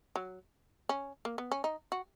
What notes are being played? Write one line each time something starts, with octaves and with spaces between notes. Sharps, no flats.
F#3
C#4
A#3
B3
C#4
D#4
F#4